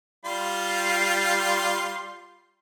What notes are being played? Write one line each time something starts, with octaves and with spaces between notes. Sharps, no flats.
G3 F4 C6